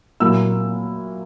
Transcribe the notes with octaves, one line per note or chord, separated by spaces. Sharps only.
A#2 F#3 A#3 E4 E6